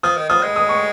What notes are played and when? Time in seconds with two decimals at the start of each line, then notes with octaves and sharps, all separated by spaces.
0.03 F3 D#6
0.17 D#3
0.29 F3 D#6
0.43 G#3
0.56 D#6
0.69 C#6